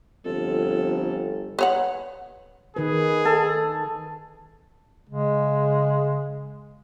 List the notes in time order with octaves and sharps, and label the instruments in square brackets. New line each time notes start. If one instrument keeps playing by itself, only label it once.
[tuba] G1 [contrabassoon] F2 [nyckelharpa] A4
[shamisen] B4 C#5 F#5
[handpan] D#3 B4 [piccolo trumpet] G#4
[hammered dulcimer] A4
[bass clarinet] C#3 [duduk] G#3